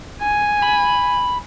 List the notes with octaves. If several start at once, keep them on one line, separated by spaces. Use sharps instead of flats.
G#5
B5